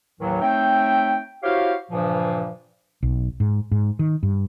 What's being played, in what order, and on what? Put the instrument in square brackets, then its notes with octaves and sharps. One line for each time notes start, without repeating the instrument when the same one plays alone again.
[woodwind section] D#2 A2 D#3 E3 F#3
A3 C4 D#4 C#5 E5 G5
E4 F#4 G4 C5 C#5 F5
G2 A#2 C#3 E3 F3
[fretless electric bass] B1
G#2
G#2
D#3
G2